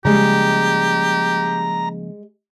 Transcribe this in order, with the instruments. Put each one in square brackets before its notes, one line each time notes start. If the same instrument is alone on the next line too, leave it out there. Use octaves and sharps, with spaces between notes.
[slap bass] C#3 F3 A#3 [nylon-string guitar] G3 G#3 [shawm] G4 [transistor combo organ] A#5